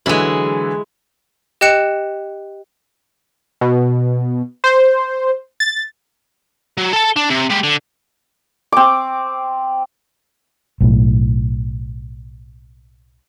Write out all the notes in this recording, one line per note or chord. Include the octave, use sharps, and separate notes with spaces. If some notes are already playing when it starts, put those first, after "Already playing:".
D3 E3 F#3 G#3 E4
G4 D#5 G5 F#6 C#7 E7
B2
C5
A6
F#3
A4 A5
D4
C3
G#3 G4
D3
C4 D6
B1 A2